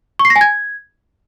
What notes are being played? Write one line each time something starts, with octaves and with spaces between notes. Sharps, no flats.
C#6
C7
A#6
G#5
G#6